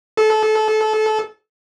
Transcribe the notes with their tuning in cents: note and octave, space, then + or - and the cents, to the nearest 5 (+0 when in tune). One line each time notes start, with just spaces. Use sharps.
A4 -25